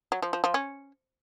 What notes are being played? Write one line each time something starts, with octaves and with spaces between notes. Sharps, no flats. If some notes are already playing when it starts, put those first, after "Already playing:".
F#3
F3
F3
F3
C#4